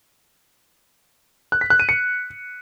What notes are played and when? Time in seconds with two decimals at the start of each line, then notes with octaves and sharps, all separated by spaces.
1.52 F#6
1.61 B6
1.70 F#6
1.80 D#7
1.89 C#7